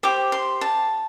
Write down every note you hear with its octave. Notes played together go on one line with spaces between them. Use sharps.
G4 C5 D6
C6
A5